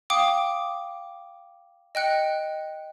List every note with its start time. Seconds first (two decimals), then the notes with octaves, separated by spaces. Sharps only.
0.10 F5 G5 D6 D#6
1.95 D#5 G5 F#6 C#7